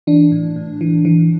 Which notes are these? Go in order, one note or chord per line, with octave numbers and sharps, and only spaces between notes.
E3 D4
A2
A2
E3
E3